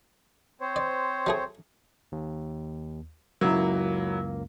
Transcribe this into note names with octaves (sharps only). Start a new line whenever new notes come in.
C4 C5 C#5
D5
F#3 A3 G#4
D#2
C#2 F#2 F#3 A#3 E4